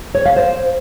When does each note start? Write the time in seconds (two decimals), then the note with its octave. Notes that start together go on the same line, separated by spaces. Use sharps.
0.15 C#5
0.26 F5
0.36 C5